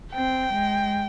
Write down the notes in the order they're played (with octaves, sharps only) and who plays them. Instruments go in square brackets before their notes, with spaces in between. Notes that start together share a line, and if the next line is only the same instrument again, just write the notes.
[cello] C4 [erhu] G5
[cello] G#3